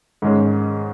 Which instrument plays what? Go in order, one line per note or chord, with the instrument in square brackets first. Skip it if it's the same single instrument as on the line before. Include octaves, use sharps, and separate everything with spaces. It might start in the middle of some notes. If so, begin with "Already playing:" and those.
[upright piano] G#2 D#3 G#3 C#4 G#4